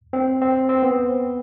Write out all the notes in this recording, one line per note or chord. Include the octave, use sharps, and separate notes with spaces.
C4
C4
C4
B3